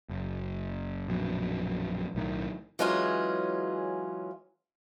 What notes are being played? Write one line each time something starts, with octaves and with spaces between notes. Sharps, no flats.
F#1
A#1 F#2 B2
B1 A2 D#3
E3 F#3 G#3 C#4 F4 G#4